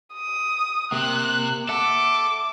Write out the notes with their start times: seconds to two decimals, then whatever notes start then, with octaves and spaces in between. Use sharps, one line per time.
0.14 D#6
0.92 C3 A#3 F#6
1.69 A4 E5 F#5 A5 D6